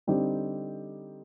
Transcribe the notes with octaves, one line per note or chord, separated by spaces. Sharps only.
D3 G3 C4 D#4 G4